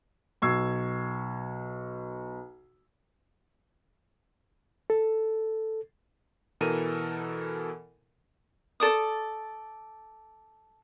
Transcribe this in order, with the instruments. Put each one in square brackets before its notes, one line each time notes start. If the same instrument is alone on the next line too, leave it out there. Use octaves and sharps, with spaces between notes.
[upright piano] B1 C#6 E6 G#6 C7
[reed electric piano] A4
[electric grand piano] B2 E3 A4 A#4 D#7
[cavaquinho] A4 D5 D#6